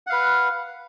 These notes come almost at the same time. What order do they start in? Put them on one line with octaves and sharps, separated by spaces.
F#5 F5 B4